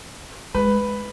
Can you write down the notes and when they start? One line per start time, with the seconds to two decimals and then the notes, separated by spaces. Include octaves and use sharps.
0.55 G#3 B4